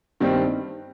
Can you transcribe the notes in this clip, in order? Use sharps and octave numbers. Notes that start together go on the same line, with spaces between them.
G2 D#3 G3 C4